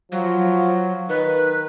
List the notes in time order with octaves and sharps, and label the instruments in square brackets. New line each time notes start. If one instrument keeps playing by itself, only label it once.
[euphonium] F3 [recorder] F#3
[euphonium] D#3 [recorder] B4